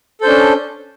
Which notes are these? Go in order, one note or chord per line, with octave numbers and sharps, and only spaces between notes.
C#4 D4 A4 C5